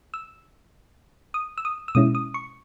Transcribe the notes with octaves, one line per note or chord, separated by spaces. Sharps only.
E6
D#6
E6
D#6
E6
B2 G#3 C#4 E4 D#6
D#6
C#6